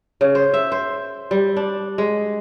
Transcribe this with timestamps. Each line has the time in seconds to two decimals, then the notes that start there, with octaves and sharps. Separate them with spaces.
0.21 C#3
0.35 C5
0.54 E5
0.72 C5
1.31 G3
1.57 D4
1.98 G#3